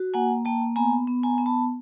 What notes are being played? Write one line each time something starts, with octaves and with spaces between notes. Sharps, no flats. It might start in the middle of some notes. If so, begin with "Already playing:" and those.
Already playing: F#4
A#3 F#5 G#5
A#3 G5 A5
B3 G#5 A#5
B3
G#5 A#5
B3
A5 B5